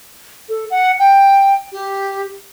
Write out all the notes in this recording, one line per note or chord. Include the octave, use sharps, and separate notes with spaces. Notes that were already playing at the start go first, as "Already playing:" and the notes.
A4
F#5
G5
G4